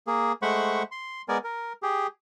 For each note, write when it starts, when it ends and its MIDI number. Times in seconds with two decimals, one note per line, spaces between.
0.07 0.32 58
0.07 0.32 68
0.42 0.83 56
0.42 0.83 57
0.42 0.83 72
0.42 0.83 78
0.42 0.83 83
0.42 0.83 85
0.91 1.22 84
1.28 1.38 56
1.28 1.38 59
1.28 1.38 70
1.28 1.38 74
1.28 1.38 80
1.44 1.73 70
1.83 2.07 67
1.83 2.07 68